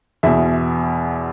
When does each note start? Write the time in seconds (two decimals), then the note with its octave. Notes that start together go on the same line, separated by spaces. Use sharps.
0.23 E2 B2 E5